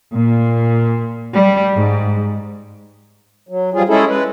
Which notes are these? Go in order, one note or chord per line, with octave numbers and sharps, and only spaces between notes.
A#2
G3
G#2
F#3
F3 G3 F4 G#4
G#3 C#4 E4 G#4 A4
G#3 B4